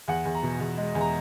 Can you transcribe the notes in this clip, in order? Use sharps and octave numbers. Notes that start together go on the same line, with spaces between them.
E2 F#5
E2
A#5
B2
E2
G#3
E2
A#5